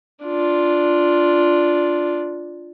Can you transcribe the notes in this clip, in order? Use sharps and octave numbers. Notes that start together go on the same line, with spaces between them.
D4 F4